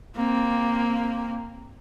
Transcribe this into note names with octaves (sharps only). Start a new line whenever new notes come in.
A#3 C4